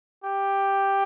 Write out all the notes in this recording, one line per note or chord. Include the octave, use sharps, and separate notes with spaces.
G4